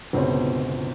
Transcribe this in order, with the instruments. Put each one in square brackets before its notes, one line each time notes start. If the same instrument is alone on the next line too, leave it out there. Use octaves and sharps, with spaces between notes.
[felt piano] G1 C#2 B2 C4 C#5